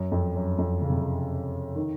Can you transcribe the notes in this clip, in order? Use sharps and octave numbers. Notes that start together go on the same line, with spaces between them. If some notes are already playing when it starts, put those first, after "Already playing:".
Already playing: F#2
F2
F#2
F2
C#3
C3
C#3
D#3